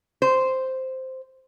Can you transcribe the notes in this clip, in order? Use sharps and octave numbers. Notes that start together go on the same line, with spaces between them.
C5